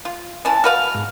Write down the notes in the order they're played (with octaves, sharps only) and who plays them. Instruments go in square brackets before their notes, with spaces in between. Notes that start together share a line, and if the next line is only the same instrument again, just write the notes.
[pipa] F4
[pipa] E3 C#4 [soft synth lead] A5
[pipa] F#4 B4 F5 [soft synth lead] F6
[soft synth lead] G#2